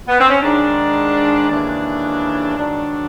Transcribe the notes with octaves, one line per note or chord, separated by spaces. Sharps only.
B3
C4
C#4
G#2 D#3 G#3 D4
D#2 C#3 E3 G#3 D4
G#2 D#3 F#3 D4